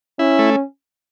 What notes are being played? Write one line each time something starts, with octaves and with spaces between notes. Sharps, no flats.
C#4 E4
A3